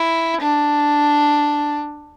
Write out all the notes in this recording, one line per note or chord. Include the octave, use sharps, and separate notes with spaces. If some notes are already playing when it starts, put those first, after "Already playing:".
Already playing: E4
D4